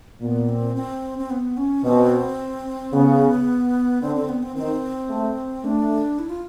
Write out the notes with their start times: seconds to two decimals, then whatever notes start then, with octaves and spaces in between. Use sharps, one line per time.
0.21 A#2 B3
0.49 C4
0.76 C4
1.19 C4
1.30 B3
1.57 C#4
1.84 B2 C4
2.93 C#3 B3
4.02 D3 C4
4.15 C4
4.29 B3
4.43 C4
4.55 D#3 C4
5.10 A3
5.64 A3 D4
6.19 E4
6.30 F4